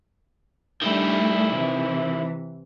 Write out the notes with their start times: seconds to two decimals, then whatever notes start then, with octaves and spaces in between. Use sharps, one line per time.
0.82 D#3 G3 A3 D4 E4
1.53 C3 E3